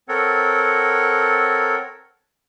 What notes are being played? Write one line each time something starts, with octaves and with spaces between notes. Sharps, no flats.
C4 A4 A#4 C#5 F#5